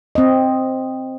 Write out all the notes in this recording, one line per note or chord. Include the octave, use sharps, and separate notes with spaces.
C4 D#5